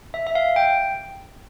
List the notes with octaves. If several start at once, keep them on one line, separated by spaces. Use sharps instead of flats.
E5
E5
F5
G5